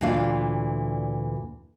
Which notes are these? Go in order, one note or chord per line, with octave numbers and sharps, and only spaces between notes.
D2 A#2 E3 D4 F5